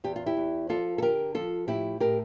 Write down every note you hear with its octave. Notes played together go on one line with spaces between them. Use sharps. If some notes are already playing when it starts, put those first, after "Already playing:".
E2 G4
F4
E4 G4
E2
F3 F4 A4
A4
D3 G4 A#4
F3 F4 A4
A2 E4 G4
A2 G4 A#4